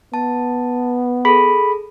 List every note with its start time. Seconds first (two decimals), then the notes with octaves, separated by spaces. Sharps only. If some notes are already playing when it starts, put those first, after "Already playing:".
0.14 B3 A5
1.25 G#4 A4 B5